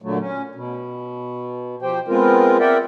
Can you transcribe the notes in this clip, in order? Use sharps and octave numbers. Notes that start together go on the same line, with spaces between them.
A#2 D3 F#3 A3
C#4
B2
F3 G4 C5 G5
G#3 B3 C4 F4 A#4
A#4 D5 E5 F#5 G5